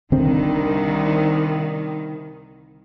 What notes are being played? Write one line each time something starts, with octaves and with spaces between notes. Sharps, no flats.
C2 D3 D#3 C4